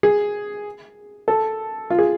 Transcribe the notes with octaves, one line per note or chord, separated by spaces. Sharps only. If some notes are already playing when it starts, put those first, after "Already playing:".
G#4
A4
F4
G#4